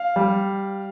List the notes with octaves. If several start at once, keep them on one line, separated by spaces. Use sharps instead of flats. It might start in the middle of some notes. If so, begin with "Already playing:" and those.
Already playing: F5
G3